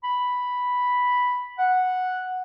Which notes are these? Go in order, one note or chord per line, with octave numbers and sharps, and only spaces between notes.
B5
F#5